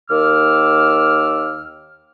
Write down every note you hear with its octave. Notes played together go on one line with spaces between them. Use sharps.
D#2 D#3 D6 E6 F6